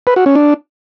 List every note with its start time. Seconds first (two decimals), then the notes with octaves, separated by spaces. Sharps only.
0.07 B4
0.16 F#4
0.26 C#4
0.35 D4